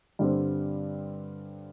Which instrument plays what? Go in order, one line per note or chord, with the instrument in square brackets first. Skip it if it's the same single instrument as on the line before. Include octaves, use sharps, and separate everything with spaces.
[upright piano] G2 D3 G3 C4